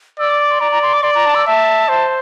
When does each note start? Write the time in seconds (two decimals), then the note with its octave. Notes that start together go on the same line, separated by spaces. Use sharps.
0.19 D5 E6
0.29 D6
0.41 D6
0.51 C6
0.61 D5 A#5
0.71 A#5
0.83 C6
0.93 D6
1.03 D5 C6
1.15 A#5
1.26 A5
1.35 E6
1.47 E5 A5
1.88 C5